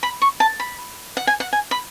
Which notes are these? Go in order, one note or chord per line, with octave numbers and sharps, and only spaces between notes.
B5
C#6
A5
B5
F#5
G#5
F#5
G#5
B5